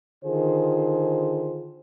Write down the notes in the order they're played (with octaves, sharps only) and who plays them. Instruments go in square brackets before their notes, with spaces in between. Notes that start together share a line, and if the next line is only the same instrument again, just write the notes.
[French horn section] D3 D#3 F4 G#4 C5